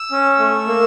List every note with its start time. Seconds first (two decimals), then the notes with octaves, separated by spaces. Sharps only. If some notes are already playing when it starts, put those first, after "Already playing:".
Already playing: E6
0.12 C#4
0.39 A3
0.67 A#3